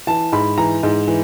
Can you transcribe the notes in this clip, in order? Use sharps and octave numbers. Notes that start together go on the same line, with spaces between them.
E3 A5
G#2 B5
E3 A#5
G#2
E3